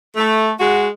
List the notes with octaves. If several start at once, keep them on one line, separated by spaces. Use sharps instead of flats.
A3
G#3 F#4